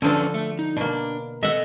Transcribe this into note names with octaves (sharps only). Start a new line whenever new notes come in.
D3 F3 C#4 D4 A4 B4
A3
D#4
B2 A#3 D4
A4 D#5 E5 F#5